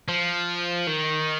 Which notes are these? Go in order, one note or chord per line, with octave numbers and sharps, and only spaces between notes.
F3
D#3